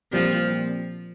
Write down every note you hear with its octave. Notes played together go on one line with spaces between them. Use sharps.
A#2 F3 G3 C4